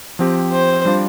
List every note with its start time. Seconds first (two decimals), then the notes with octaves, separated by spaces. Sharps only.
0.19 F3 C4 G4
0.52 C5
0.85 G3 D4 F4